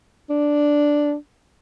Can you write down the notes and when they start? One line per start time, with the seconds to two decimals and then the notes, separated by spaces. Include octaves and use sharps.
0.30 D4